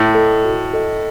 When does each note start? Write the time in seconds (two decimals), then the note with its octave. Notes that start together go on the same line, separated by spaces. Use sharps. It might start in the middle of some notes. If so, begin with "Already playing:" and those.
Already playing: A2
0.15 A4 D#5
0.44 F#4
0.74 A4 D#5